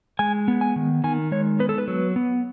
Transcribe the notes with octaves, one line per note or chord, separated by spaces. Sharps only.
G#3 G#5
B3
G#5
D#3
D#3 G#5
G#3 C#5
B3 B4
A4
B4
F#3
B3